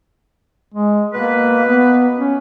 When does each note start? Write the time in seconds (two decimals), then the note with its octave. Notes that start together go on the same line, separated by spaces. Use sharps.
0.74 G#3
1.14 B2 A#3 B4
1.65 B3
2.17 C#4